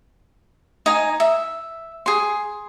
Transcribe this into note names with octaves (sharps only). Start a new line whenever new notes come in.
D#4 G#5
E5
G#4 C6